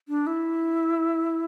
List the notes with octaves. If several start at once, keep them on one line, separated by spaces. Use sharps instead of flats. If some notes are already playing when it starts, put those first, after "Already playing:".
D4
E4